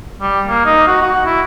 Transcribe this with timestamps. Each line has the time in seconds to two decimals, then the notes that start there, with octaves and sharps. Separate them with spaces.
0.21 G3
0.47 A#3
0.66 D#4
0.88 F#4
1.02 F#4
1.26 E4